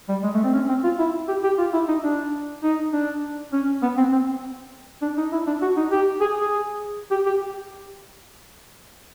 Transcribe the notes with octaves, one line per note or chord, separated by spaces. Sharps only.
G3
G#3
A3
C4
C#4
C4
F4
E4
G4
G4
F4
E4
D#4
D4
D#4
D4
C#4
B3
C4
C4
D4
D#4
E4
D4
F#4
D#4
G4
G#4
G#4
G4
G4